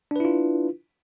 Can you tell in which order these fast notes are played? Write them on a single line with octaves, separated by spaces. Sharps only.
D4 B4 E4 F4